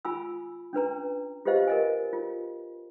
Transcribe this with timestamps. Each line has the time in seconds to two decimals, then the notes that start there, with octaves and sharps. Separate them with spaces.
0.05 F4 G#5 B5 E6
0.73 C#4 D4 B4 A#5
1.45 F4 G4 B4 C5 D#5 F5
1.67 A#4 D#5 G#5
2.13 F4